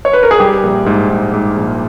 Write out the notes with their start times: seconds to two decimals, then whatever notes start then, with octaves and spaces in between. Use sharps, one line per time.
0.05 C#5
0.13 B4
0.23 A#4
0.31 G#4
0.40 G3 G4
0.63 A#1
0.86 G#2
1.10 G#2
1.33 G#2
1.57 A#1